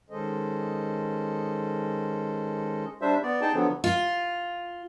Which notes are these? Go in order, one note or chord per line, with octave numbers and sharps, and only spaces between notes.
D#3 G#3 C#4 A4 C5 D#5
G3 D4 C5 E5
B3 D5
D#4 G#4 G5 A5
D3 F3 F#3 B3
F4